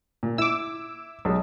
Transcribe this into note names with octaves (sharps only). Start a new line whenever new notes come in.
A#2
E4 D6 E6
B1 G#3